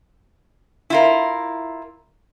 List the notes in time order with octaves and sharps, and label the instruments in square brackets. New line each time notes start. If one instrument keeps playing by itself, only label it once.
[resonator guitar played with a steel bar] E4 F4 A#4